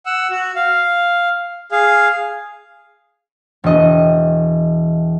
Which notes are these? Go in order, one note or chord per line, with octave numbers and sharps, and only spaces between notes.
F#5 E6
F#4
F5
G#4 F5
E1 D#5